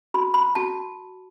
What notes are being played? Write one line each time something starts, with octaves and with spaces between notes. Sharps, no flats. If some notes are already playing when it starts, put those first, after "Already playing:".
F#4 B5
B5
F#4 A5